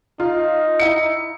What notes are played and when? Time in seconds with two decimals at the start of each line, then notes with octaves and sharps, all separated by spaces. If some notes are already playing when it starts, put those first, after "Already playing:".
0.20 D#4 F4
0.79 E4 C#7